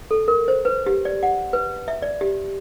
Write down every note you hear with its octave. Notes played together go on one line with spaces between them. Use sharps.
A4
A#4
C5
B4
G4
D5
F#5
B4
E5
D5
G4